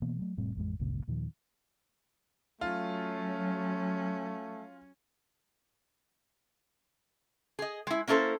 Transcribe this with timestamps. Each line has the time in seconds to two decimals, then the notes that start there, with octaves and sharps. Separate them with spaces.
0.02 B2 E3 A#3 B3
0.19 F#3 A3
0.37 F1 A2 G3 C4
0.55 A1 F2 G#3
0.79 G1 C#2 A#2 C#3
1.07 D#2 A#2 D#3 F3
2.61 F#3 A3 C#4 F4
7.59 G#4 D#5
7.87 G#3 E4
8.08 A#3 C#4 E4 A4 C5